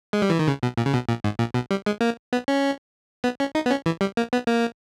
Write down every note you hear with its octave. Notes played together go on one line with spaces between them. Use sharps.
G#3
G3
E3
D#3
C#3
B2
A#2
C#3
B2
A#2
G#2
A#2
B2
G3
G#3
A#3
B3
C#4
B3
C#4
D#4
B3
C#4
E3
G3
A#3
B3
A#3